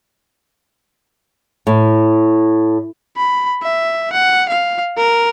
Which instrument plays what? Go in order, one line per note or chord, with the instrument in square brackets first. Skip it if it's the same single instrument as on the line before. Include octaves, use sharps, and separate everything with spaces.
[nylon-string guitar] A2
[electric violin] B5
E5
F#5
F5
A#4